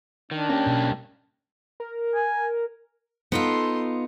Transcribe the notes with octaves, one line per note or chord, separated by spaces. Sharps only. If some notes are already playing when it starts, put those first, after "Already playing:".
D#3 D4
A#3 C#4 G4
B1
A#4
G#5
B3 D#4 F4 A4 C6